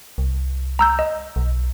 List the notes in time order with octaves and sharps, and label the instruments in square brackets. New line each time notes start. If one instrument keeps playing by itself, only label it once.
[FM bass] C2
[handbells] A#5 E6 G6
D#5
[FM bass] B1